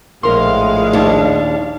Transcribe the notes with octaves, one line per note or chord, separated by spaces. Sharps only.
A#1 A2 G#3 A#4 F5 C6
D#2 D4